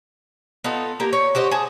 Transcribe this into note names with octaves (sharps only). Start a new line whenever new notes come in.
B3 D#4 F4 A4
A#3 G4 A#4
C#5
F#4 G4 C5 D#5
G#4 A5